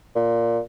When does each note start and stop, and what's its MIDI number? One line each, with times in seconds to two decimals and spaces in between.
0.16 0.59 46